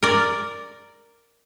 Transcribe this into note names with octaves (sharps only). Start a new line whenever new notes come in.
A#4 D5